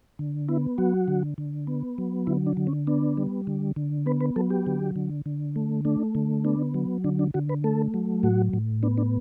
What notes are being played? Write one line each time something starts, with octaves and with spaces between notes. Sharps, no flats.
D3
B3 E4
F#3 F#4
D3
D3
B3
F#3
D3 E4
D4
D3
C#4
B3 D4
G3
D3
D3
B3 B4
B4
F#3 A4
G4
D3
D3
D3
A3
A3 D4
D3
B3 D4
F#3
D3 D4
D4
D3 F#4
B4
A3 A4
F#3
A2 F#4
A2
B3 D4
D4